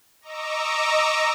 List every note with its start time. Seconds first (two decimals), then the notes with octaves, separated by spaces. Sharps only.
0.21 D#5 A#5 C#6 D6 E6